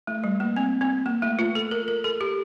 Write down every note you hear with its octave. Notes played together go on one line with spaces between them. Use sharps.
A3
G3
A#3
C4
C4
A#3
A3
F4
A4
A#4
A#4
A4
G4